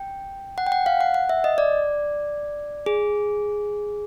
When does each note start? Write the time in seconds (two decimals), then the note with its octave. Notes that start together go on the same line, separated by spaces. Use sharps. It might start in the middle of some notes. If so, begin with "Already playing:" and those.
Already playing: G5
0.58 F#5
0.67 G5
0.72 F#5
0.86 F5
1.01 F#5
1.14 F#5
1.29 E5
1.44 D#5
1.58 D5
2.86 G#4